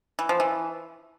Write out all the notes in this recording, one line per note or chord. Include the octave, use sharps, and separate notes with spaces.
E3
F3
E3